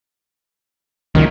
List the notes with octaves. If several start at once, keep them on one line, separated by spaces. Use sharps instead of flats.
C#2 F#2 A#2 D#3